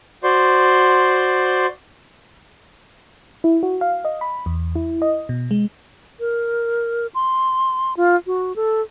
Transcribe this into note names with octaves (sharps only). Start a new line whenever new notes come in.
F#4 C5 D5 C6
E4
F#4
F5
D#5
B5
E2
E4
D#5
B2
G#3
A#4
C6
F4
F#4
A4